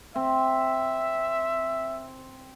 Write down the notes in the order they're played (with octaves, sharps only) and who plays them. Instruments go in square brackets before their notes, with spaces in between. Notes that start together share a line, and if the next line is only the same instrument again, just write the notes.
[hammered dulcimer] C4 [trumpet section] E5